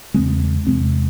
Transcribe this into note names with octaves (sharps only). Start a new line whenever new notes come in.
E2 C#3 G#3 C4
E2 C3 G#3 C4